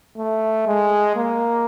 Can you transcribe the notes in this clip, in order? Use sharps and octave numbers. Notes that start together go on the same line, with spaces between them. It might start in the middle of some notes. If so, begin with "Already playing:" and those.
A3
G#3
A#3